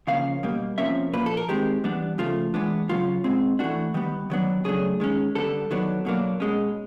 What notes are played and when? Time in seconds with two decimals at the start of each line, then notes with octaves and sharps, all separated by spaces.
0.07 C#3 F3 A#3 C#4 F5
0.43 B2 G3 A#3
0.78 C3 F3 A#3 C#4 E5
1.13 A#2 F3 A#3 B4
1.26 A4
1.37 A#4
1.48 D#3 G#3 C4 G4
1.84 E3 G3 B3 D4
2.18 C#3 F3 A3 F4
2.54 E3 G#3 B3 D4
2.89 C#3 F#3 A#3 C#4 F4
3.24 B2 G#3 C4
3.59 E3 A3 D4 F#4
3.94 D#3 G3 B3
4.30 D#3 F#3 B3 D4
4.64 C#3 F#3 A3 D4 G#4
5.00 D#3 G#3 C#4
5.35 D3 G3 B3 D4 A4
5.71 D#3 F#3 B3 D4
6.05 B2 F#3 A#3 D4
6.40 B2 G#3 C#4